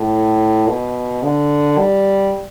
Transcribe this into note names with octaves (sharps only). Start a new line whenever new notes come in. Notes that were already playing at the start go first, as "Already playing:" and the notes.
Already playing: A2
B2
D3
G3